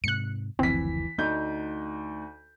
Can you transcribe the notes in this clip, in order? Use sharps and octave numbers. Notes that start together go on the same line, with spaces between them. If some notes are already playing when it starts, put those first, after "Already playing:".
G#2 C3 F#6 C#7
F#1 D2 E3 F3 C4 B6
D2 A3 D#4 G6